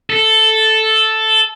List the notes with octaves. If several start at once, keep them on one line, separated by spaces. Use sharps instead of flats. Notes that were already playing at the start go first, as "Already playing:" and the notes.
A4